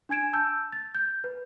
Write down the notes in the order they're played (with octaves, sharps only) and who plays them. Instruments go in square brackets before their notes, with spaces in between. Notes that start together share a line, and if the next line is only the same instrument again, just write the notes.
[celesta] D4 G#5 G#6 D7 E7
A5 E6 G6
A6
G6
B4